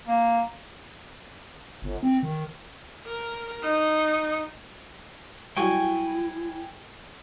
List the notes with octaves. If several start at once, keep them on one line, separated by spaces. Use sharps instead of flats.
A#3
G1
C4
D#3
A#4
D#4
F#3 G3 E4 F#4 G5 G#5 C#6